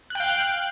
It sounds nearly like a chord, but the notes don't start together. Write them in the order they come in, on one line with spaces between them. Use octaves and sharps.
F#6 G5 F5